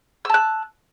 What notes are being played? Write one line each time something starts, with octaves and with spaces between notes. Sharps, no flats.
A5 E6 F#6